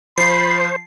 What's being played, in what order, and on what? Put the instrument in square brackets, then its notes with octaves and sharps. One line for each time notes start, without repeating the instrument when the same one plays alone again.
[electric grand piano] F3 F4 [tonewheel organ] C5 [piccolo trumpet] B5 [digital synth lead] C7